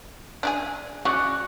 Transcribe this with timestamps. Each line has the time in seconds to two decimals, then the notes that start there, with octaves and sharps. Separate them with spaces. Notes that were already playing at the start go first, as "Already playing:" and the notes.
0.43 D4 E4 G#4
1.05 C#3 F#4 D5 F#5